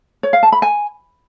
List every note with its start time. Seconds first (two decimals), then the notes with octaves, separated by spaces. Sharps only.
0.23 C#5
0.33 F5
0.43 A5
0.52 B5
0.62 G#5